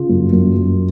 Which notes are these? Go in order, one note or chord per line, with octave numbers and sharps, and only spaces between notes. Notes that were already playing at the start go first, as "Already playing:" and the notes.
Already playing: C#3 F4
F#2
F#2
F#2